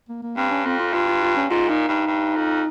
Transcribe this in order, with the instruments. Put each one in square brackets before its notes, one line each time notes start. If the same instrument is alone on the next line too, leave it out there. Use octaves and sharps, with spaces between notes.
[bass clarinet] A#3
A#3
[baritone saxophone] G2 [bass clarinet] C4
[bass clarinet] C#4
[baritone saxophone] F2 [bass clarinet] C4
[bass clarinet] F4
[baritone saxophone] G2 [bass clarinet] F4
[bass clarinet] F4
F4
C#4
[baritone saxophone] G#2 [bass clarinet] F4
[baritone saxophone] A#2 [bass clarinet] D#4
[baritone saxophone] G2 [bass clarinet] D#4
[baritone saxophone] G2
F2